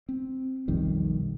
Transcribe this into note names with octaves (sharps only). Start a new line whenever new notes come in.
C4
B1 F2 D#3 G3